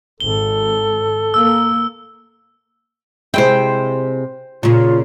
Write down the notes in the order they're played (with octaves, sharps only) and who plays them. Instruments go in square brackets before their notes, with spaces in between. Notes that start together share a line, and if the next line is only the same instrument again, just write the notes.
[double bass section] G#1 [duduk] A4 [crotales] G7
[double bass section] A#3 [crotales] E6
[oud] C3 G#3 E4 [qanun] C5 G5
[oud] A#2 C#3 [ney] F4